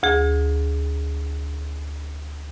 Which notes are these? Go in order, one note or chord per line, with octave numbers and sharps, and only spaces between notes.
D2 G#4